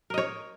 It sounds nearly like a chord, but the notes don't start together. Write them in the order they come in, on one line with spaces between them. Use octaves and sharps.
A#4 D#5 C#5